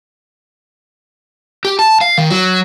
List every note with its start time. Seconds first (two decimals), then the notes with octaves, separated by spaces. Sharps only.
1.65 G4
1.79 A5
2.01 F5
2.18 D#3
2.30 F#3